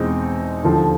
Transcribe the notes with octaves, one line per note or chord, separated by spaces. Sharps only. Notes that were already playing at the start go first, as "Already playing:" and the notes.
Already playing: E2 B2 G#3 C4 D#4
D#2 D3 F3